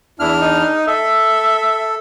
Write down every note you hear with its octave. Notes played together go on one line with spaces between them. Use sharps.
E2 D4 E4 F6
D#4
A4 E5